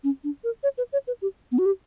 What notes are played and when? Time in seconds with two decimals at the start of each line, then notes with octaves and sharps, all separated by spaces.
0.04 C#4
0.24 D4
0.44 A#4
0.63 C#5
0.78 B4
0.93 C#5
1.08 B4
1.22 G4
1.52 B3
1.58 F#4
1.66 G4